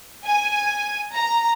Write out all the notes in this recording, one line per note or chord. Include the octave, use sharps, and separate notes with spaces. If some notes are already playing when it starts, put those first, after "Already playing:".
G#5
A#5